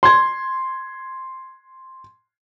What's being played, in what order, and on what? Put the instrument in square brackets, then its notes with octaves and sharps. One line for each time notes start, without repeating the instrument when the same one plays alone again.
[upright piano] C6 G#6